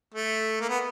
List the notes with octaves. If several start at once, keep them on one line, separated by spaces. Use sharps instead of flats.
A3
A#3
B3